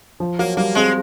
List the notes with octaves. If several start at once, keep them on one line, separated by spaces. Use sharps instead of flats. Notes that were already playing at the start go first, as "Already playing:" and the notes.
F3
F#3 A#3
G3 A#3
G#3 C4